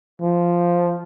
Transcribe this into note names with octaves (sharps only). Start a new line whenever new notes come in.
F3